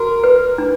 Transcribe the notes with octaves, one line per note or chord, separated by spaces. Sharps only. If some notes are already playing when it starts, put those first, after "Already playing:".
Already playing: F#4 A#4
B4
D4